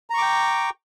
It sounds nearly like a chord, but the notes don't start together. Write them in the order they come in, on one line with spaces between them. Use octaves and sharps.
A#5 C#6 D6 G5